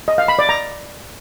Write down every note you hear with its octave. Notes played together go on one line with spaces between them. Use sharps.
D#5
F5
B5
D5
A#5